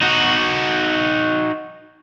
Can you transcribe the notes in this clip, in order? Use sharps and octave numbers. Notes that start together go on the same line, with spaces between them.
D#4 F#4